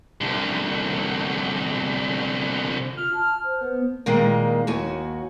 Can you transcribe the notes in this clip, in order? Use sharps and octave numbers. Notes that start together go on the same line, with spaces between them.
C2 D3
F4 F6
A5
C5
B3
A#2 D#3 G#3 A#3
D#2 F#4 G#5